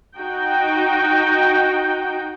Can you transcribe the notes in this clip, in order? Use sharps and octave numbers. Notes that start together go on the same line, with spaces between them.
D#4 F#4 G5